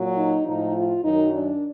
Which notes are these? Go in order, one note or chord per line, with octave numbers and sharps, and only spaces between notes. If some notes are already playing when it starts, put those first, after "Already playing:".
Already playing: A#2 F#3
D#4
A2 F3 D#4
F4
F#2 D#3 F#3 D#4
D4